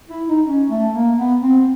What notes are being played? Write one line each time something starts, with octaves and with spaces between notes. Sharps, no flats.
E4
D#4
C#4
A3
A#3
B3
C4